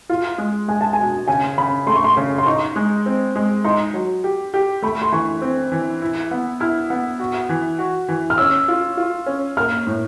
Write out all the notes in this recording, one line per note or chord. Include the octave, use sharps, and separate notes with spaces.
F4
G#3
G#3 G#5
A5
G#5
B2
C#3 G#5
C#3 B5
A3 C6
C#6
C6
C#3
C6
D#4 C#6
G#3
C4
G#3
D#4 C6
F#3
G4
G4
A3 B5
C6
E3 C#6
C4
E3
E4
B3
E4 F6
B3
F#4
E3
F#4
E3
F6
C#4 E6
F4
F4
C#4
A#3 F6
A2